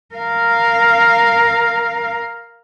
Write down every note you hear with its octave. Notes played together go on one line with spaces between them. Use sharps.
A#4 F5